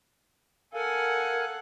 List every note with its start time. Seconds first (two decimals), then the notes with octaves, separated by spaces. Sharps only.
0.73 A4 A#4 F5 F#5 G#5